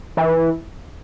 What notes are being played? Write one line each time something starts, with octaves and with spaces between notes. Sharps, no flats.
E3